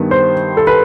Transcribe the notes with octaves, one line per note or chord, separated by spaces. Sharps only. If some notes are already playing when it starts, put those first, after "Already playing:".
Already playing: G2 D#3 G3 B3
C5
A4
B4